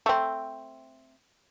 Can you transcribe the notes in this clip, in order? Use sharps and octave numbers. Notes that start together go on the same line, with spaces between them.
A3 C4